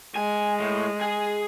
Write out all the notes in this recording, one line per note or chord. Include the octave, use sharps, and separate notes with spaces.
G#3 G#5
A2
G#4 G#5